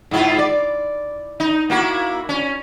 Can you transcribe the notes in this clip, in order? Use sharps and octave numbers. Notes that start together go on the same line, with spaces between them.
G#2 E4 F4
D5
D#4
A#3 E4 F#4
C#4